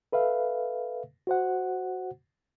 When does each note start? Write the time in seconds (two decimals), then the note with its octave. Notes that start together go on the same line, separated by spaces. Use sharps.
0.12 A4 B4 E5 F5
1.27 F#4 C5 F#5